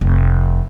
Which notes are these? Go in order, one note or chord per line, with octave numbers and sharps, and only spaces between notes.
F1